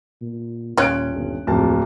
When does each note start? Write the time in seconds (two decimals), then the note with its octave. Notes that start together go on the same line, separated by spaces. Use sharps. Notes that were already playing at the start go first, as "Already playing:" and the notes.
0.21 A#2
0.78 D#1 A#2 C#4 F4 F#6 D7
1.14 G1
1.47 D1 F2 A#3 A5